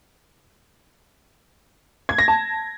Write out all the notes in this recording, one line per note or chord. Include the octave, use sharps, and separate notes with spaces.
G#6
A#6
A5